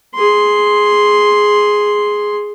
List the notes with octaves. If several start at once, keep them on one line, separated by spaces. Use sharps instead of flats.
G#4 C6